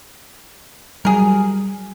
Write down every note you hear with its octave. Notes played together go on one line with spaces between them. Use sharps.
F#3 G3 G#4 A#4